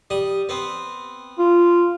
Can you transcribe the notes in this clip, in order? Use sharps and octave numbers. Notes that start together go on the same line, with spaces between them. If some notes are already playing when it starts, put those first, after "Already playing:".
G3 D#6
B3 C4
F4